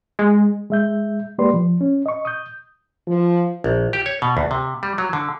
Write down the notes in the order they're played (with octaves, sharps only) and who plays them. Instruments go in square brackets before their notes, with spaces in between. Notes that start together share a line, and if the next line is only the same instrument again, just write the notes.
[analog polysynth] G#3
[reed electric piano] G#3 E5 G6
G#3 A#3 G4 B4 D5 C6
F3
C#4
D#5 C#6
D#6 G6
[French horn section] F3
[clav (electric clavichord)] A#1
G4
C#5
B2
D2
C3
G3
F#3
D3